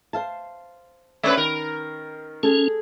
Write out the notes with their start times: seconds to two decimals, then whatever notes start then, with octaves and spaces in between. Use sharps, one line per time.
0.13 C5 F5 A5
1.23 G#3 C#4 B4 C#5 D5 E5
1.37 D#3 A#4
2.43 C#4 G#4 A4